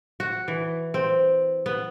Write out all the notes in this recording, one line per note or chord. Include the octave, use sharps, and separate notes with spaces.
F#4
E3
C4
B3